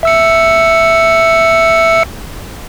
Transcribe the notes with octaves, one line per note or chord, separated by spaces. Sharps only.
E5 E6 C#7